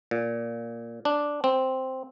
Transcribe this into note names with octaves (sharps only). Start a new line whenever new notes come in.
A#2
D4
C4